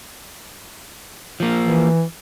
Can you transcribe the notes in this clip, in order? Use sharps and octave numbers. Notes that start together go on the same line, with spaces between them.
F3 A#3
E3